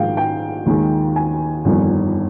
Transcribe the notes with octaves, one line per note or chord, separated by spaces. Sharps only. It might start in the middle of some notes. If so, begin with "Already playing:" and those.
Already playing: A#1 G#2 D#3 G#3 F5 G5
G5
D#2 D#3 G#3
G#5
G1 F2 D#3 G3